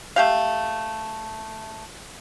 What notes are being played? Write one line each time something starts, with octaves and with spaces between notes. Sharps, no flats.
A3 G4 F5